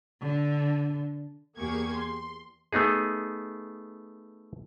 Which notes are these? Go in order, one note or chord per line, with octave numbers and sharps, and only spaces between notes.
D3
E2 A#3 G4 G#4 C#6 G#6
C6
A3 B3 D#4 G#4